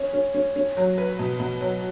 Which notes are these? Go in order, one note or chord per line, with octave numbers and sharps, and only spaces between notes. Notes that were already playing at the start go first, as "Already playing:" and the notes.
Already playing: C#4
C#4
C#4
C#4
F#3
B4
B2
B2
F#3